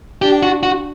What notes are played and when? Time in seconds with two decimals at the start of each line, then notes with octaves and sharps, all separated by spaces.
0.22 D4 G4
0.43 F#4
0.63 F#4